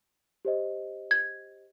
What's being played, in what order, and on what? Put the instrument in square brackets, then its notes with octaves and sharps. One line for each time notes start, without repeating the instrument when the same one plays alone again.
[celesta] G4 C5 D#5
[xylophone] G#6